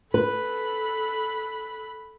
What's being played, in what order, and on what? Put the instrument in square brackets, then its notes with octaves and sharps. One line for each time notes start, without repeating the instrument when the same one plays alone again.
[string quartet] A4 B5 F#6 [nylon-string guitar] B4